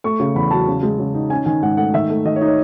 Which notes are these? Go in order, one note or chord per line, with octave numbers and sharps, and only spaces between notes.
A3 C#6
C#3
E2 B5
F#3 A5
C#3
G#3
C#3
D#4
C#4 G#5
D#3 G#5
G#2 F#5
A3 F#5
D#3 E5
A3
D#3 D#5
C#5
D#4
C#5